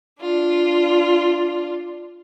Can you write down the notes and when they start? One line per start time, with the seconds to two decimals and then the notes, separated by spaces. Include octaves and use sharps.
0.20 D4 F4